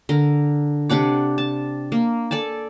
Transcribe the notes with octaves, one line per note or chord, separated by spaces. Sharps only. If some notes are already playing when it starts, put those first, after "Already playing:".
D3 A#4
C3 D4 F#5 D6
A5
A#3
A4 D5 G#5 A5